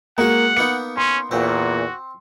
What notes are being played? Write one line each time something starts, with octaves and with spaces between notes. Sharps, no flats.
G#3 A#3 F#4 F#5
A#3 B3 D#4 C#7
C#4 C6
E2 A#2 C4 F#4